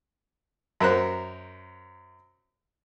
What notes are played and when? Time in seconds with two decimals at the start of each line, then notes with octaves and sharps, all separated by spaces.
0.80 F#2 A#4 C5 F#6